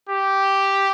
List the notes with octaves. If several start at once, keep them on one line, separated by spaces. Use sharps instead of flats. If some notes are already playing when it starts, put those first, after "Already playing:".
G4